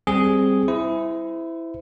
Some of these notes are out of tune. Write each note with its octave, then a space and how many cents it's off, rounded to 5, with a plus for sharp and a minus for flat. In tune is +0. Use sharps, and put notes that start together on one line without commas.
G3 +0 C4 +0 G#4 +0
E4 +0 C5 -35